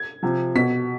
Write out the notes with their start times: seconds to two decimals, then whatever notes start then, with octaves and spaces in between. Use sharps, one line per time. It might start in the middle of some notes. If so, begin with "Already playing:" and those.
Already playing: G#6
0.23 C3 F3
0.55 B2 B6